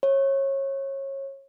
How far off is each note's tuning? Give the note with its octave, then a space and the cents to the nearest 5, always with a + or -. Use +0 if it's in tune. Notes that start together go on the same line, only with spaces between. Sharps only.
C#5 -25